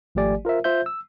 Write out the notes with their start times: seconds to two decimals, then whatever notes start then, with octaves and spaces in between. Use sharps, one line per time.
0.15 G#1 F3 A3 G4 D5 G#5
0.45 F4 A#4 C5 E5
0.64 F4 C5 E5 G6
0.86 E6